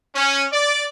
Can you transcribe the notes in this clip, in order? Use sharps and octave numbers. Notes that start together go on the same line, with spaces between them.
C#4
D5